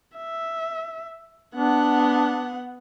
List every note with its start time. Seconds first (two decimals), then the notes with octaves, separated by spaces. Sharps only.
0.17 E5
1.56 B3 D4 F#5